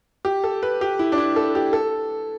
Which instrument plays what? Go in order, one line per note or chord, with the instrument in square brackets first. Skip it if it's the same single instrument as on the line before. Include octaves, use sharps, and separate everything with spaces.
[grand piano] G4
A4
B4
G4
E4
D4
E4
A4
G4
A4